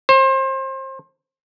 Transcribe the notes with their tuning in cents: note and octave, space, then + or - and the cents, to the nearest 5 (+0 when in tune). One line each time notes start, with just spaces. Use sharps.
C5 +30